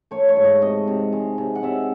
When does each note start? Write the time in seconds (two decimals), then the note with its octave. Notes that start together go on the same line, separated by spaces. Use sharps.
0.11 A3 C#5
0.29 C#5
0.37 G#2
0.45 D#5
0.62 C3 D#5
0.87 C3
1.13 G#3
1.38 C3
1.55 F#5
1.63 C3 E5